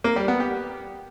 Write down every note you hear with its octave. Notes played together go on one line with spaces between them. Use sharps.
A#3
G3
B3
G4